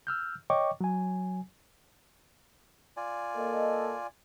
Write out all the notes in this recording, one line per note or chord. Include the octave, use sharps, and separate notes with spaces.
E6 F6 G6
C#5 D#5 G5 C#6 D6
F#3 G#5
F4 D5 G#5
A#3 A4 D#5